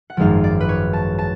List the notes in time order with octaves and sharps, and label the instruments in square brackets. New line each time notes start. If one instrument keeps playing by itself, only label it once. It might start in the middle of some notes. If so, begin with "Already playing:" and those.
[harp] F#5
G#1 F#2 F3 G#3 F5
D5
B4
C#5
A5
A5